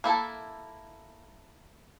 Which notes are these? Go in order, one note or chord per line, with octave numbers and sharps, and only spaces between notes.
A#3 E4 A4